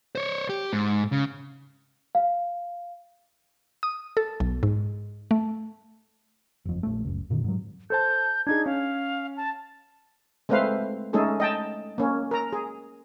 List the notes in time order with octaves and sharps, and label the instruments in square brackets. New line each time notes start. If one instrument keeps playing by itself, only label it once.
[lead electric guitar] C5 C#5
G4
G#2
C#3
[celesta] F5
[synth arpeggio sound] D#6
A4
B1
G#2
A3
[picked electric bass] F#1 F2
A#1 A3
F#1 C#2
F1 A#2 D3 D#3
G#2 F#3
[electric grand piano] A4 C5 A5 [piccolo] G6
[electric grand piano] D4 D#4 G#4 [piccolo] G#6
[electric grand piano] C#4 [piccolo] F5
[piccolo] A5
[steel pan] G#3 A3 C4 B4 C5 F5
G#3 A3 C#4 D#4 G#4 A4
D#5 G5 A5
A#3 C#4
A#4 A#5
G#4